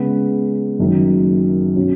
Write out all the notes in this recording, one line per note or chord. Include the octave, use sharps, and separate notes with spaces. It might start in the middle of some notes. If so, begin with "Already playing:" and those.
Already playing: C#3 G#3 B3
F#1 F#2 D#3
B2 F#3 C#4